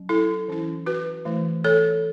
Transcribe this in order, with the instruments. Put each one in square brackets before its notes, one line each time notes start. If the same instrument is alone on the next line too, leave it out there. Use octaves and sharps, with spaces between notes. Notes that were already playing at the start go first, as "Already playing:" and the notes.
Already playing: [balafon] F#3 C#4
E4 A4
E3 C#4 E4
F#4 B4
E3 A3 E4
A4 C#5